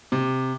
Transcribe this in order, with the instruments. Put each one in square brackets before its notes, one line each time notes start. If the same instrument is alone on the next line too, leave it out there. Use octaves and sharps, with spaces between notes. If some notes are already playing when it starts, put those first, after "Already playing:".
[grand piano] C3